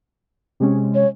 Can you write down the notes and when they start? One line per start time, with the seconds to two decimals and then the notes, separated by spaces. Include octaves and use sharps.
0.60 C3 G#3 C#4
0.95 C#5